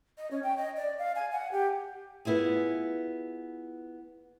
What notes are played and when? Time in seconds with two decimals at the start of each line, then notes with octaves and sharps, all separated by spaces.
0.18 D#5
0.31 C#4
0.43 G5
0.58 D#5
0.77 D5
0.99 F5
1.16 G#5
1.32 F#5
1.52 G4
2.25 B3 E4 F4 G#4